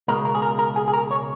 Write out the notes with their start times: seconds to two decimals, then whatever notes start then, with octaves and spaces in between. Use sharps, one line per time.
0.08 C#2 B2 G#3 A#4
0.25 A#4
0.35 G#4
0.42 A#4
0.59 A#4
0.76 G#4
0.88 G#4
0.93 A#4
1.11 C#5